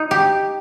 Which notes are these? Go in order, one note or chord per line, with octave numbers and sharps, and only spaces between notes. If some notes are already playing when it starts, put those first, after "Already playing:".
Already playing: D#4
G4